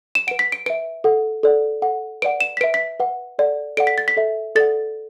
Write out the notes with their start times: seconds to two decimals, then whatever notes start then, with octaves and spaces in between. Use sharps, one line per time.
0.15 E7
0.27 B4 F#5 D7
0.39 B6
0.52 D7
0.66 B4 E5 D7
1.04 A4 F#5
1.43 A4 D5 F#5
1.82 A4 F#5
2.22 B4 D5 F#5 D7
2.41 E7
2.57 B6
2.61 B4 E5 D7
2.74 B6
3.00 B4 F#5
3.39 A4 D5 F#5
3.77 A4 D5 F#5 D7
3.87 B6
3.98 A6
4.08 B6
4.17 A4 E5
4.56 A4 D5 F#5 A6